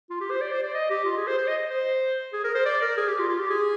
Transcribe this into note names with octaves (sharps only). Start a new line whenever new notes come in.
F4
G4
C5
D5
C5
D5
D#5
G4
F4
G#4
C5
C5
D#5
C5
G#4
A#4
C5
D5
A#4
G#4
G4
F4
F4
G4
G#4